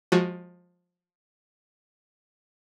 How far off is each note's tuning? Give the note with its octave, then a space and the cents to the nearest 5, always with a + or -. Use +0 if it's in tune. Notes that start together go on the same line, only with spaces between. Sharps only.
F3 +20 G#3 +0 F#4 +0